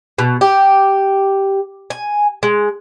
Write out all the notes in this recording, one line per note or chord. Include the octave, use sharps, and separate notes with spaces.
B2
G4
G#5
G#3